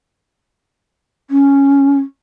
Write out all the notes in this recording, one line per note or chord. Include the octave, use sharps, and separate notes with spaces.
C#4